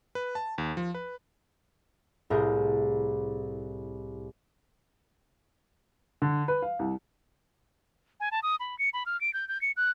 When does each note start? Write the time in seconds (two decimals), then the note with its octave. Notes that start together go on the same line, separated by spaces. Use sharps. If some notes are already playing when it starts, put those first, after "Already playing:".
0.15 B4
0.35 A5
0.58 D#2
0.77 F3
0.95 B4
2.30 C2 A2 G#4 A#4 G6
6.22 D3
6.48 B4
6.62 F5
6.79 C2
8.20 G#5
8.32 A5
8.43 D#6
8.60 B5
8.79 C#7
8.93 B5
9.06 F6
9.21 D7
9.34 G6
9.48 G6
9.62 C#7
9.77 F#6